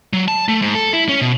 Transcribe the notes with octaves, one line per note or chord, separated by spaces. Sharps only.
F#3
A5
A3
G#2
A4
E4
C#4
B2